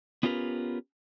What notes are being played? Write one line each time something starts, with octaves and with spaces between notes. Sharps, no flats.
B3 C#4 F4 G4 A#4 B4